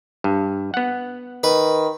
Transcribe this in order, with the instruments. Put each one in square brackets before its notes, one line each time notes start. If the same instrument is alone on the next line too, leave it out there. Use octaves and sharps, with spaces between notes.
[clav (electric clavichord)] G2
B3 F#5
[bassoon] D#3 [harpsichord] B4